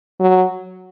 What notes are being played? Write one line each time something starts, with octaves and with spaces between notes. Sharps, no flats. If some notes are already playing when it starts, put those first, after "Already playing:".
F#3